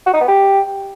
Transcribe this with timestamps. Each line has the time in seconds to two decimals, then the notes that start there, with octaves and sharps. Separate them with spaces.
0.07 F#4
0.14 D#4
0.21 B3
0.28 G4